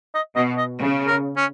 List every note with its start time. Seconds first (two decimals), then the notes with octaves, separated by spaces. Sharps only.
0.14 D#5
0.36 B2 D#5
0.58 D#5
0.80 C#3
1.07 A#4
1.37 C#4